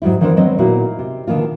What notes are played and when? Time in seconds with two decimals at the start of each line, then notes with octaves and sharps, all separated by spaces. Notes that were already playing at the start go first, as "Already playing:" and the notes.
0.02 G#2 F#3 G3 E4
0.21 D#3 E3 B3 D4 A#4 C5
0.37 F#3 G#3 B3 C4 B4 D#5
0.58 A#2 A#3 B3 D#4 E4 F#4
0.99 C3
1.27 B2 D3 D#3 G#3 A#3 F4